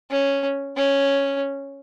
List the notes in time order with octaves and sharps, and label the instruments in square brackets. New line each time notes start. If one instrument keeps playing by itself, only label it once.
[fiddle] C#4
C#4